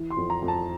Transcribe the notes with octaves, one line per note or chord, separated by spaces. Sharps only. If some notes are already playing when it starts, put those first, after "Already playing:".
Already playing: E3
C6
F2
A#5
F2
A5